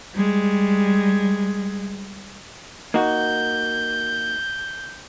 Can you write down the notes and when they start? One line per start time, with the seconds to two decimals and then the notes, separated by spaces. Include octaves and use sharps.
0.14 G3 G#3
2.94 A#3 D#4 F#4 G6